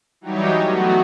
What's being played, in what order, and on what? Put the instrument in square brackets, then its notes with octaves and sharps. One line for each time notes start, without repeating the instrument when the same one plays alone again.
[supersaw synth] E3 F#3 G3 D#4 G4 C#5
F#3 A3 B3 D#4 F#4